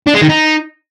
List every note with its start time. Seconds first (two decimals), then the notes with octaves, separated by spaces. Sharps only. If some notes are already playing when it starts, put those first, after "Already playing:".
0.07 D4
0.14 G#3
0.22 D#3
0.29 D#4